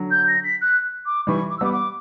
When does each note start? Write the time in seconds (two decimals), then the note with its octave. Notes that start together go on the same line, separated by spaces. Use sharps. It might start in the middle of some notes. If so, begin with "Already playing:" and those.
Already playing: D3 F#3
0.10 G6
0.27 A#6
0.44 B6
0.61 F#6
1.05 D6
1.27 E3 G3 C#6
1.50 D6
1.57 E6
1.61 G3 B3 D6
1.72 D6